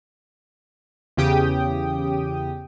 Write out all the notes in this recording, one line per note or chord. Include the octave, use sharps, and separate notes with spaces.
E2 C#3 G4 G5 D#6